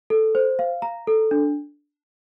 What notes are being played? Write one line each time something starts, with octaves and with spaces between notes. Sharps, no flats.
A4
C5
F5
A#5
A4
D4